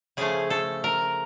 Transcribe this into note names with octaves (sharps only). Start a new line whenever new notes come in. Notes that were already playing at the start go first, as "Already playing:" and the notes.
C#3 F3 A3 G#4
A4
A#4